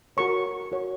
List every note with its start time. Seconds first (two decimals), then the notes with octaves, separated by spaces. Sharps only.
0.17 F#4 A#4 C#5 C#6
0.72 F#4 A#4 C#5